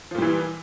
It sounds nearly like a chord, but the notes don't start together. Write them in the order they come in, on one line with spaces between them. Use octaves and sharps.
F3 A#2 G3 E3